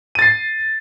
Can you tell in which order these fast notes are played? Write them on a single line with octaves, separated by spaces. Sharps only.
D#7 A6 C7